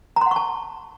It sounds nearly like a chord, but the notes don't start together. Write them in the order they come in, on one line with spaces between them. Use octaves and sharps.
A#5 C6 F#5 C#6 A5